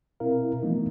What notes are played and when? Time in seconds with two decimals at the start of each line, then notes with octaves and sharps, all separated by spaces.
0.20 B2 C4 E4 A#4 F5
0.63 E3 F3 A3 B3 D#4